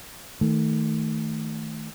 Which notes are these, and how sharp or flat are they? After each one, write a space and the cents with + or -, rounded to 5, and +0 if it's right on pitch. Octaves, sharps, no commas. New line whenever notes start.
D#3 +20 A3 +0